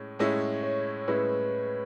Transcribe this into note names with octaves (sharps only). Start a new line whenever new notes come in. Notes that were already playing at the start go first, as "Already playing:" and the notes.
Already playing: A2 G#3 C#4
A2 G#3 C#4 E4
C#5
A2 G#3 C#4 E4 B4